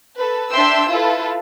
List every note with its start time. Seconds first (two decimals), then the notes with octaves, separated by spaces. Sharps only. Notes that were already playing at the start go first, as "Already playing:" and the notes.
0.16 A4 B4
0.51 D4 E5 G5 C6 E6
0.89 E4 F4 A4 B4